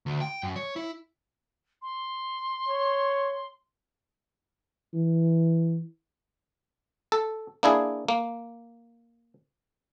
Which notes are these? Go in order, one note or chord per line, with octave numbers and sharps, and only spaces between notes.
D2
G5
F#2
C#5
E4
C6
C#5
E3
A4
A#3 D4 E4 G#4
A#3